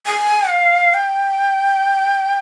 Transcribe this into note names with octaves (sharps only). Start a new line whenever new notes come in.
G#5
F5
G5